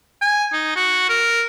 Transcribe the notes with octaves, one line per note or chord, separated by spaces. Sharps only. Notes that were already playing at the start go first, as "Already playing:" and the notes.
G#5
D#4
F#4
A#4